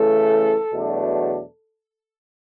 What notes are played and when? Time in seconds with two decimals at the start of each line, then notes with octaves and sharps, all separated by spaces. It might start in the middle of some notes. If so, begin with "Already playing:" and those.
Already playing: C#3 E3 A3 A4
0.73 E2 B2 F#3 A3 D4